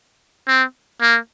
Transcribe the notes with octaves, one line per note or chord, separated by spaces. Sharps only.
C4
A#3